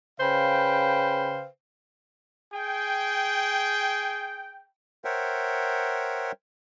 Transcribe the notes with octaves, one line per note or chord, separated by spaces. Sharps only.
C#3 B4 C5 F5 G5
G#4 G5
A#4 C5 C#5 E5 F#5 G5